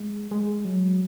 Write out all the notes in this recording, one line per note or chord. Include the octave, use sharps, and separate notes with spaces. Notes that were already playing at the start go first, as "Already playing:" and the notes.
Already playing: G#3
G#3
F#3